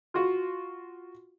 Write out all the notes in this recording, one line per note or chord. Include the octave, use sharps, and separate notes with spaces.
F4 F#4